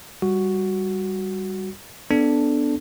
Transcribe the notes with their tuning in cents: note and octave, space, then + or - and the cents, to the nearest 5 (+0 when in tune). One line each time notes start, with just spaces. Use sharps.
G3 +0 F#4 +0
B3 +15 D4 +0 A4 +0